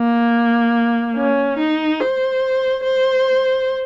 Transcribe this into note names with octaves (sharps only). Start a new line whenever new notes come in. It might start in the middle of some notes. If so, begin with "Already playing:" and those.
Already playing: A#3
C#4
D#4
C5
C5